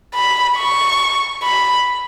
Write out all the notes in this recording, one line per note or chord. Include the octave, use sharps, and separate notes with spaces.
B5
C#6
B5